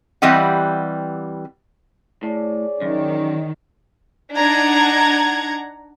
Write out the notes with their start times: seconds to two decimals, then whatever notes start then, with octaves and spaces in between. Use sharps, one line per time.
0.22 E3 G3 C4 G4 D#5 F#5
2.23 A2 G#4 C#5 D5
2.81 F#2 D#3
4.37 D4 D#4 F#5 A#5 G#6